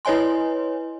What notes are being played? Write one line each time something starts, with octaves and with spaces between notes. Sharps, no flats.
E4 B4 C#5 D#5 G#5 C6